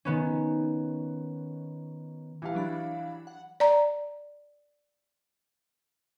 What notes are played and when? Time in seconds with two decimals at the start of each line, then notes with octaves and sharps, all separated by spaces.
0.05 D#3 B3 C#4
2.42 E3 G4 F5
2.55 F#3 D4 B5
3.27 F#5
3.60 D5 A#5